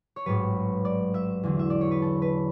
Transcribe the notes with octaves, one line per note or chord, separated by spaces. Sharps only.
C#5
A1 G#2 F#3 B4
D5
E5
E2 D3 F#3
E5
D5
C#5
B4
A4
B4